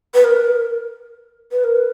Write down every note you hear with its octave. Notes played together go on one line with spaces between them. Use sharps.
B4
A#4
B4
A#4
B4